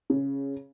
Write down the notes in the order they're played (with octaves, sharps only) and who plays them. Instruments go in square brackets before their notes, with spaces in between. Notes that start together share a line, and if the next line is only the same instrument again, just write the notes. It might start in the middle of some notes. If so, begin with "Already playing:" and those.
[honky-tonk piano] C#3